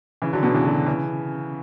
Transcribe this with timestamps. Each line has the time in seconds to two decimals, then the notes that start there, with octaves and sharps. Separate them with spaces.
0.22 C#3 E3
0.33 D3 F#3
0.43 B2 D3
0.54 C#3 E3
0.65 D3 F#3
0.87 C#3 E3